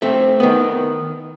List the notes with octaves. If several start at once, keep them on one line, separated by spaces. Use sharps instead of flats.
A3 C4
D#3 B3